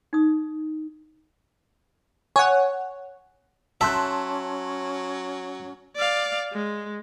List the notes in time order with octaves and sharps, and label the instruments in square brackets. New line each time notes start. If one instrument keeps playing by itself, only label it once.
[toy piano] D#4 D#6
[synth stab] C#5 F#5 [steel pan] G#5
[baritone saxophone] F#3 [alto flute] C#4 [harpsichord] E5 [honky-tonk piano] A5 C6 F#6
[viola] D5 F5
G#3